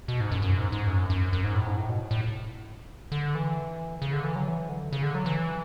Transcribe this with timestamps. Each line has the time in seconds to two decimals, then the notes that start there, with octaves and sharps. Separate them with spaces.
0.08 B2
0.20 G#2
0.32 F#2
0.42 F#2
0.58 G#2
0.72 G#2
0.87 F#2
1.10 F#2
1.33 F#2
1.44 G#2
1.55 A2
1.66 G#2
1.77 A2
1.89 B2
2.11 A2
3.12 D3
3.35 E3
4.02 C#3
4.13 D3
4.24 E3
4.35 F#3
4.48 E3
4.69 D3
4.93 C#3
5.03 D3
5.15 F#3
5.26 E3